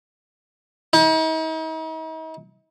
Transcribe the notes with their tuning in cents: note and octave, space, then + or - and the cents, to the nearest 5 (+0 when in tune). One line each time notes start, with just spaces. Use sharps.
D#4 +45